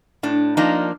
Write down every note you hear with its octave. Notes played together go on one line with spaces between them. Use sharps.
A2 D4
F3 A#3 D4 D#4